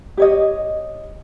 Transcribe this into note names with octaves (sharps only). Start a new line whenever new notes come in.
G4 C#5 D#5